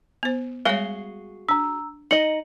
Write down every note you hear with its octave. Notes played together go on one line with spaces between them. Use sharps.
B3 C5
G3 G#3 F#4 G#4 C#5 F5 G7
D4 A#5 E6
D#4 D#5 C#7 F#7